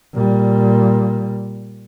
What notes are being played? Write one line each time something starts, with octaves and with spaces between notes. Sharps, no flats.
A#2 G3